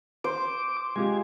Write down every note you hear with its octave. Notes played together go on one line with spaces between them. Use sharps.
C5 D6
G#3 F4 G4 G#5